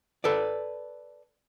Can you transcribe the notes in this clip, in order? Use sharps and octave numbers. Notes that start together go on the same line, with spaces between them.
A4 B4 D5